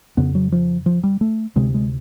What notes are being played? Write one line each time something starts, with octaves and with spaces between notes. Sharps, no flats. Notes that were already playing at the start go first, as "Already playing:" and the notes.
F2 C#3 B3
F#3
F3
F3
G3
A3
D2 C3 G#3
G#3